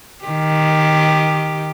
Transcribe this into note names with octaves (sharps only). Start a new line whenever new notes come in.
D#3 G4